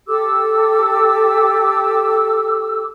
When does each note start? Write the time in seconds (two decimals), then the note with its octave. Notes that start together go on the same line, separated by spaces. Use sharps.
0.08 G4 A4 D6 E6